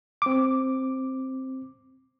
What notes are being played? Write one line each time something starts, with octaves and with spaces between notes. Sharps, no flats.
C4 D6